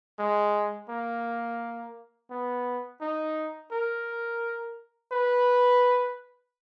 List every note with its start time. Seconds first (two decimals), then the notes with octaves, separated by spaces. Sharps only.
0.19 G#3
0.89 A#3
2.30 B3
3.01 D#4
3.72 A#4
5.12 B4